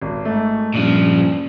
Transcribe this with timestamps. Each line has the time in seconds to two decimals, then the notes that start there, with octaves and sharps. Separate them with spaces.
0.02 G#1
0.25 G#2 A3
0.74 G2 A#2 C#3 F3